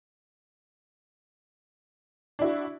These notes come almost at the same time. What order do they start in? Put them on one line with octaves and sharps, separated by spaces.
D4 E4 F#4